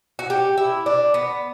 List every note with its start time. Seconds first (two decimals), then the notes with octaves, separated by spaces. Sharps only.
0.19 F#4
0.30 G4
0.58 E4
0.86 D4
1.14 B3